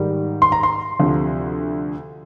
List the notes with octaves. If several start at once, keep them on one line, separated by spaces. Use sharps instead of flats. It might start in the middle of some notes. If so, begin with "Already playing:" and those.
Already playing: G#2 D#3 G3
C6
A#5
C6
D2 C3 F3